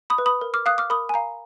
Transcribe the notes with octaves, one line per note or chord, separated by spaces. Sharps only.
B5 D#6
B4
B5 D#6
A#4
D6 F6
F5 D#6 F#6
D6 F6
A#4 B5 D#6
G#5
F5 A#5